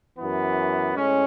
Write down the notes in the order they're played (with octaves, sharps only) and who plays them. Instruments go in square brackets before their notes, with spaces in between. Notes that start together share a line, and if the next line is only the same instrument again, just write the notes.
[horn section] F#2 E3 B3
A2 G#3 C#4